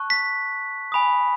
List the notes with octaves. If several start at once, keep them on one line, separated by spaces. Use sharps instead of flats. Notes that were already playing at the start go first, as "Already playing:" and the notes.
Already playing: A5 C#6 F#6
B6
G#5 B5 D#6